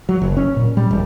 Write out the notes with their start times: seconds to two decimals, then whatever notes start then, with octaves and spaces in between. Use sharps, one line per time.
0.09 F#3
0.22 F#1
0.37 C#4
0.57 A#2
0.77 G3
0.91 E1